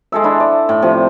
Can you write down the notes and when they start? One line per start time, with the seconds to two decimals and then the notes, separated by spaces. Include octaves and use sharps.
0.12 G#3 A4 E5
0.24 D4 E4
0.40 D5
0.69 A2
0.82 C3 F3